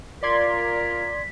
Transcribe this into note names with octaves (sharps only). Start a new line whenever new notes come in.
F4 A#4 D5 C6 G#6 B6